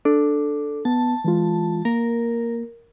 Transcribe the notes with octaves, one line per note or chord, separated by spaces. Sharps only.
D4 A4
B3 A5
E3 G#3 F4
A#3 A#4